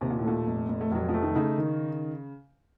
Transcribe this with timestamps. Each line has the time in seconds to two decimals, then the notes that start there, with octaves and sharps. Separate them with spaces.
0.01 D#2 C3
0.10 A#2
0.19 A2
0.24 A#2 A3
0.47 F1
0.68 F1
0.81 A3
0.92 F1 F#3
1.09 F3
1.14 A3
1.22 D#3
1.35 C#3 D#4
1.58 D#3